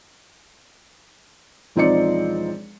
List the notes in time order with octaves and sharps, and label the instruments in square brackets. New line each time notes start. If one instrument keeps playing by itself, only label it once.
[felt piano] E1 F3 C4 D#4 D5 C#7